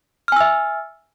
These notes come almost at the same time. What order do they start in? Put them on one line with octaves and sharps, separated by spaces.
F6 G#5 E6 E5